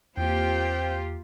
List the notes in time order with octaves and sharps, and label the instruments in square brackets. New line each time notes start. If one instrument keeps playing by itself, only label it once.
[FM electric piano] E2 [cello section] A#3 F4 G4 [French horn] C4 [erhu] G5